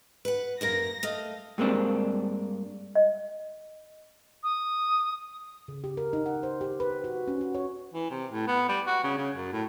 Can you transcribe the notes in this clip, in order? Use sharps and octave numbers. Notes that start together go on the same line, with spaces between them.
B4 F#5
F#2 A#3 A#4 A#6
A3 D#5 F5
G2 G#3 A#3 C4 D4
D#5
D#6
C#3
G4
A#4
D#4
F#5
C5
G4
B4
F#4
C#4
F#4
C#5
E3
C3
A2
B3
G3
F#4
C#3
C#3
F#2
A2